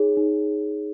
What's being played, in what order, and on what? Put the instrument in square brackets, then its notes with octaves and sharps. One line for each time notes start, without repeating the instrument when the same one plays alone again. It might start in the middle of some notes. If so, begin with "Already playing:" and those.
Already playing: [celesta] D#4 G#4 C#5
D#4